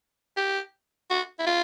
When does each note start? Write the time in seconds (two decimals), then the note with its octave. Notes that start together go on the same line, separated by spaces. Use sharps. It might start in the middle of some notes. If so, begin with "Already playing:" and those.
0.37 G4
1.10 F#4
1.39 E4
1.47 F4